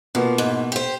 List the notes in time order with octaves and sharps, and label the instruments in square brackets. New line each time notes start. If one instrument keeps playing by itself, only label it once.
[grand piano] B2 A#3 B3 [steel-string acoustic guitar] F3
[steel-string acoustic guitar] G#2
G4 C5